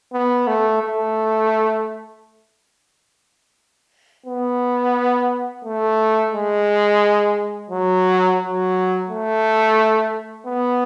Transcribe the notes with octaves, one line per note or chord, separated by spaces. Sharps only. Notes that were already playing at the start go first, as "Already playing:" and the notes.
B3
A3
A3
B3
A3
G#3
F#3
F#3
A3
B3